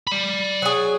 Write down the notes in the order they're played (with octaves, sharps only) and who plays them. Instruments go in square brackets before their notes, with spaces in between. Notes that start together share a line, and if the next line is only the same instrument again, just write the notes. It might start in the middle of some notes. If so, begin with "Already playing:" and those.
[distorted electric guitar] D5 B5
[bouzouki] F#3 G#4